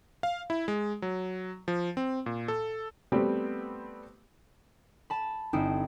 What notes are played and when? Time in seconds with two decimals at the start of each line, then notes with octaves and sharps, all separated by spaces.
0.23 F5
0.50 E4
0.68 G#3
1.02 F#3
1.68 F3
1.97 C4
2.26 A#2
2.48 A4
3.12 G3 A3 B3 C4 G4
5.10 A5 B5
5.53 G1 C4 D#4 E4 D#6 D7